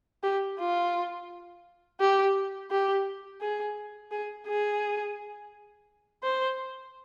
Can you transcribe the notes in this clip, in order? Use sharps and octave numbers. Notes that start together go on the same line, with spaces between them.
G4
F4
G4
G4
G#4
G#4
G#4
C5